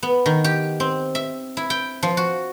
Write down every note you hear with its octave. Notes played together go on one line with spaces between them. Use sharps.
B3
D#3
G4
C4
E5
E4
G5
F3
F#4